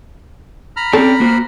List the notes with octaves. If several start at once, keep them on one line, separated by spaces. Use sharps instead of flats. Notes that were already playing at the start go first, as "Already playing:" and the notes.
A#5 B5 F6
C4 C#4 A4 D5
A#3 F#4 C5